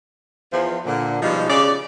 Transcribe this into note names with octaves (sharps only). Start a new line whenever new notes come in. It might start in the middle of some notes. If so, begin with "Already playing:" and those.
E2 F3
A#2 D3
B2 F3 G3 G#3 D#4
C#3 D5